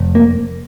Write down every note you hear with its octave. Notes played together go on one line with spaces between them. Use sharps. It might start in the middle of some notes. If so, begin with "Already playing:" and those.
Already playing: F1
A#3